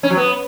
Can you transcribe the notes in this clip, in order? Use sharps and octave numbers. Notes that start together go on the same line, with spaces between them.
C#4
F#3
B3